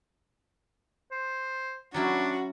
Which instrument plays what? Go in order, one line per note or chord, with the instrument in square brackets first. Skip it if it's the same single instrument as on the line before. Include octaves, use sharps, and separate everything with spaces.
[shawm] C5
[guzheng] F#3 C#4 E4 [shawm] D4 [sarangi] F#4